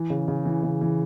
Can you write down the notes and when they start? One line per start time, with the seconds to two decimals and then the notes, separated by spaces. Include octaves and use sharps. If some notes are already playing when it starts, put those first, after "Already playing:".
Already playing: E3
0.10 C#3
0.28 C#3
0.46 E3
0.63 C#3
0.81 E3